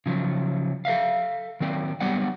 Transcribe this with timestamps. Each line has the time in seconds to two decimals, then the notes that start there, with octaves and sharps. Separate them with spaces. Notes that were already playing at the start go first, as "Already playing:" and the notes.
0.06 C#3 F3 F#3
0.85 A4 B4 E5 F5
1.60 D#3 F#3 C4 D5
2.00 F#3 G3 B3 D5 F#5